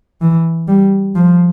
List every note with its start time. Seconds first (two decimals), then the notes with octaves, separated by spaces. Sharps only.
0.21 E3
0.68 G3
1.15 F3